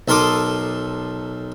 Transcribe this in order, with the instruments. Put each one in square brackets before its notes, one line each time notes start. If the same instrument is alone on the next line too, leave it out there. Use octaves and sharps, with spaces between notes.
[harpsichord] B1 A4 A#4 C6 D6 D#6